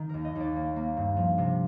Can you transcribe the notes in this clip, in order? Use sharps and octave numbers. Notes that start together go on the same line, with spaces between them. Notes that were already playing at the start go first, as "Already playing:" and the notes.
Already playing: D#3
D#2 A#4
D#5
D#2 D5
A#3
A#3
G2
F3
C3